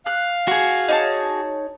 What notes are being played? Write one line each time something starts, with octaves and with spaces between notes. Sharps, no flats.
F5 F#6
F#4 G#4
D#4 C#5 A5